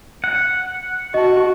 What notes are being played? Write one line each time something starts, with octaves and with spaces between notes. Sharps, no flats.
F#5
F#4 D#5 A5